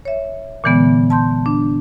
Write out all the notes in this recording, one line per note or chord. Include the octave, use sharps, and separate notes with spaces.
C#5 E5
A#2 D3 E3 G#3 B3
A5 C6 G6
D4